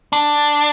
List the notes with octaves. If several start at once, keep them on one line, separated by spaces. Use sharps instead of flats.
D4